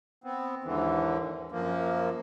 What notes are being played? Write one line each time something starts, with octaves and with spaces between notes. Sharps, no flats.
B3 C4
D#2 G#2 D3 E3
F#2 F3 A#3